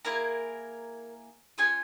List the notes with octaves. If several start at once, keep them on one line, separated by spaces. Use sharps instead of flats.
A#3 E4 G#4 A#4 A#5
C#4 F4 G#4 G#5